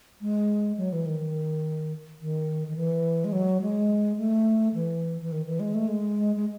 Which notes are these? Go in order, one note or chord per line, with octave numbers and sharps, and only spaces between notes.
G#3
F#3
E3
D#3
D#3
D#3
E3
G#3
F#3
G#3
A3
E3
E3
D#3
E3
G#3
A3
G#3
G#3